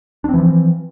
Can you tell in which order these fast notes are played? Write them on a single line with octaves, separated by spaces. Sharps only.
D4 C4 E3 F3